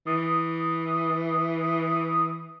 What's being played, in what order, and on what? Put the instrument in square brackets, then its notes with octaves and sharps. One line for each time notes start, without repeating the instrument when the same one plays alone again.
[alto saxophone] E3 [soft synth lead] D#6